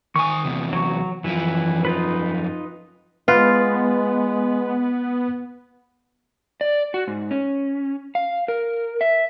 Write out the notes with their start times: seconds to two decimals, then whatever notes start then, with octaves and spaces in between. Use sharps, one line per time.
0.16 D#3 G#5 C#6 D#6
0.44 E2 C3
0.73 F#3 C#6
1.24 F#2 E3 F3
1.85 D#4 F4 B4
3.28 G#3 B3 F4 B4
6.61 D5
6.94 F#4
7.07 G#2
7.31 C#4
8.15 F5
8.48 A#4
9.01 E5